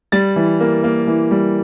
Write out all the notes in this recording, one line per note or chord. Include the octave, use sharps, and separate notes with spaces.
G3 A6
E3
A#3
A#3
E3
G3